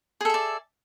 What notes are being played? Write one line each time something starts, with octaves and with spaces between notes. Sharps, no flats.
G#4 A4 D5 E5